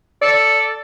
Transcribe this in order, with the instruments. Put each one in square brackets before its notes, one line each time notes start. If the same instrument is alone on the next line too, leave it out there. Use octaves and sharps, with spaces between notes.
[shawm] A4 [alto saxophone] D5